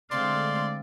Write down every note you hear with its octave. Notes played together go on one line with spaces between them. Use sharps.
D3 G#3 A3 C4 D5 F5 C6